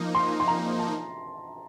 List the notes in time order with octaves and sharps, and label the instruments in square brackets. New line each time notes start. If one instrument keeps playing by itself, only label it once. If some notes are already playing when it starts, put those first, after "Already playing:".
Already playing: [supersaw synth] F3 A#3 D#4
[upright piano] C6
C6
A#5
A5